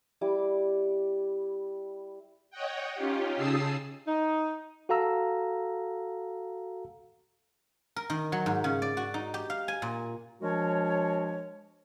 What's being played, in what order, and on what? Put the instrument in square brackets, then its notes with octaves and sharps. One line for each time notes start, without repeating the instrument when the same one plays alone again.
[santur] G3 E4 D6
[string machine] C#5 D#5 F#5 G5
C#4 D#4 F4 G4
C#3 G#4 A5 D#6 E6 C7
[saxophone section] D#4
[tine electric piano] F#4 A4 F5 A#5 E6
[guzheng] A#4
D#3
F#3
G#2
C#3
D5
F#4
D#4
G4
F5
G#5
A#2
[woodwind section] F3 G#3 D4 F#4 A#4 C#5